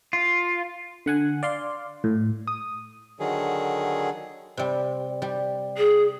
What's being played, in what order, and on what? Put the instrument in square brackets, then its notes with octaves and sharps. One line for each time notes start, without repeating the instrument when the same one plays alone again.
[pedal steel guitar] F4
[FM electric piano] D3 F#5 G#5
D5 F5 C6
A2
D#6
[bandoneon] D3 D#3 F#3 G#4
[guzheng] C3 G3
G3
[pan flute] G#4